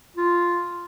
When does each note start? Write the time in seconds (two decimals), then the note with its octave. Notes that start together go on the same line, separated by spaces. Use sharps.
0.16 F4